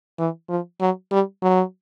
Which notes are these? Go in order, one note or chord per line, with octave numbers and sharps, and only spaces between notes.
E3
F3
F#3
G3
F#3